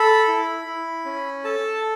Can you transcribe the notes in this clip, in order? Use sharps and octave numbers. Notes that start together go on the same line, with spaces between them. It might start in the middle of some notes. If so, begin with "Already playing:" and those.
Already playing: A4 B5
E4
E4
C#4
A4 A5